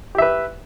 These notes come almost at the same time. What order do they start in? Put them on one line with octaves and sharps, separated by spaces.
G4 E5 B4